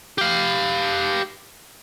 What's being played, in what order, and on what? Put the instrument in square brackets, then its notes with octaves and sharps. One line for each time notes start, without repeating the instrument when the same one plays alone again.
[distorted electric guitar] G4 F5